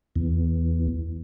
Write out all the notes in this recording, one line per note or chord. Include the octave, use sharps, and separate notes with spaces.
E2